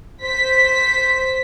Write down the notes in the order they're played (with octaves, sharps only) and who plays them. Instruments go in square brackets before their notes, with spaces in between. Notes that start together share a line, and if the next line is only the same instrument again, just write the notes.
[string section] C5 B6